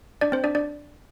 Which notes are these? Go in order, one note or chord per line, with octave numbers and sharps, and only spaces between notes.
D4 D5
C4 C5
D4 D5
D4 D5